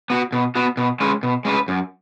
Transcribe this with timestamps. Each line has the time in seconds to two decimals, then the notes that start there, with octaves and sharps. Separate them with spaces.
0.10 B3 F#4
0.32 B2
0.55 B3 F#4
0.77 B2
1.00 G#3 C#4 B4
1.23 B2
1.45 G#3 C#4 B4
1.68 F#2